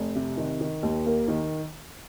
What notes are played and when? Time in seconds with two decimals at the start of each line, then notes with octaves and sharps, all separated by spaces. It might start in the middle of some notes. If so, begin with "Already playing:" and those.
Already playing: F1
0.15 C3
0.37 D#3
0.61 D#3
0.83 D#2
1.06 A#3
1.28 D#3